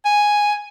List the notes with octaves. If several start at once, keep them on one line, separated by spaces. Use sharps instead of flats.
G#5